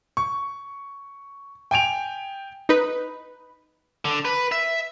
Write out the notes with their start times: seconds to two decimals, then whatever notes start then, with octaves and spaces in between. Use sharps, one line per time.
0.17 C#6
1.71 G5 G#5 D7 F7
2.69 D#4 B4
4.05 D3
4.25 B4
4.52 E5